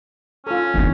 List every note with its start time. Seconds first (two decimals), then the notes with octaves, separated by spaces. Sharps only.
0.47 C#4 F4 A4
0.74 D#3 E3 A#3 B3 D4